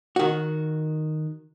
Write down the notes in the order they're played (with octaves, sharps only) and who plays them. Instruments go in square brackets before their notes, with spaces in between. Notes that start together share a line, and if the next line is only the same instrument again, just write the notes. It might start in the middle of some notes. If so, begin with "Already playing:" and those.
[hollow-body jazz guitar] D#3 F#4